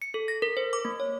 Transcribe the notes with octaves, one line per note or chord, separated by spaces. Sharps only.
C#7
A4
A#6
A#4
C5
D6
A#3
C#5